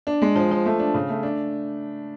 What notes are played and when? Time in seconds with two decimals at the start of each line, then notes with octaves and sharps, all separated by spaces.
0.07 D4
0.22 G#3
0.36 F3
0.51 F3
0.66 A3
0.79 D4
0.94 C#3
1.09 A3
1.23 D4